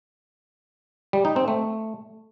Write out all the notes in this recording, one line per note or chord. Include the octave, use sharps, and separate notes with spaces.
G3
D#4
C4
A3